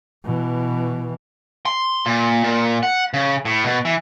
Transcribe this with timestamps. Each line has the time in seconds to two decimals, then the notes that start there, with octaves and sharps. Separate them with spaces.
0.24 B2 E3
1.66 C6
2.06 A#2
2.44 A#2
2.83 F#5
3.14 C#3
3.45 A2
3.65 B2
3.85 E3